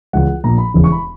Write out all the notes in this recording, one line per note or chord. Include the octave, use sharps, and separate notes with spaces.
C#2 C#3 E3 F#5
A#1 A#2 A#5
B5
E1 E2 C#3 E3
C#6
B5